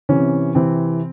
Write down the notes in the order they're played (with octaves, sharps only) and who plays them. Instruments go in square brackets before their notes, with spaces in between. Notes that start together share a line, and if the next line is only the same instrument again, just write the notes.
[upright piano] C3 E3 C#4
C3 E3 C4